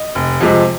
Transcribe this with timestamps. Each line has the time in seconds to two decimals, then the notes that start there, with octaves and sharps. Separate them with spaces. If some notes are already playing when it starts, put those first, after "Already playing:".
Already playing: D#5
0.15 F1
0.41 F2 C3 F3 G#3